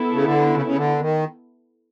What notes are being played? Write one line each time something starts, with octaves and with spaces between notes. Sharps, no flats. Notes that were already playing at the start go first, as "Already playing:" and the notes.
Already playing: B3 E4 A4
C#3
D3
C#3
C#3
D3
D#3